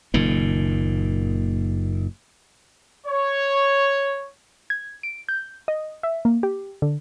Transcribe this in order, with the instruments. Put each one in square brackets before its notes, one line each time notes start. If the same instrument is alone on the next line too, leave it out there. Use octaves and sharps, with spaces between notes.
[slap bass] F#1 A#2 D#3
[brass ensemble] C#5
[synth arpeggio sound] G#6
D7
G6
D#5
E5
A#3
G4
D3